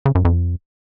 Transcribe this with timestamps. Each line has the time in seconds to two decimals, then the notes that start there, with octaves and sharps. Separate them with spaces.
0.06 C#3
0.15 F#2
0.25 F2